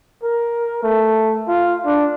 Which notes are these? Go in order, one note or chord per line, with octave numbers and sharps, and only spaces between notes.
A#4
A3
F4
D4